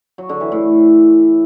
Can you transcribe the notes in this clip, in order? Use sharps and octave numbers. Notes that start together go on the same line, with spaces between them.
F#3
D3
E3
A2